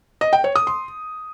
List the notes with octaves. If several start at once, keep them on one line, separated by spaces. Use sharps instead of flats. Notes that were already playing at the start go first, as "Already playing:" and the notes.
D#5
G5
C#5
D#6
C6